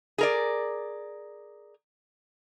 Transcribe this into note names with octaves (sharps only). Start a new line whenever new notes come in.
G#4 A#4 D5